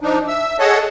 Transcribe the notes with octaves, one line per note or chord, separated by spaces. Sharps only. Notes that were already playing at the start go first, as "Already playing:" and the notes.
F3 D4 D#4
E5 E6
G#4 A4 C#5 D#5 F#5 A5